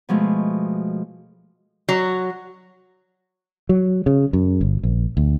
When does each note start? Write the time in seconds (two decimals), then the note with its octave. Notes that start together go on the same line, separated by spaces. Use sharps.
0.09 B2 F3 G#3 A3
1.89 F#3
3.69 F#3
4.06 C#3
4.33 F#2
4.61 G1
4.83 A#1
5.17 D2